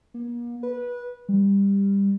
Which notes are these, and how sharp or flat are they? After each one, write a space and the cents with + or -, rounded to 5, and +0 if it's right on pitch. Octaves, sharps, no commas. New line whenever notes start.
A#3 +40
B4 -20
G3 +20